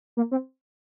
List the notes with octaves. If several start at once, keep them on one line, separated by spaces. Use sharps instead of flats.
A#3
C4